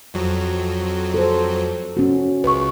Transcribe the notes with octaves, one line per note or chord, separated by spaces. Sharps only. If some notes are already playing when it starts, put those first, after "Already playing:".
F2 F#3
A4 C5
C#4 F#4
C#2 B4 C#6